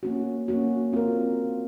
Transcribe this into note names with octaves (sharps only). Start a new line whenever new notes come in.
A#3 C#4 F#4
A#3 C#4 F#4
C4 F4 A#4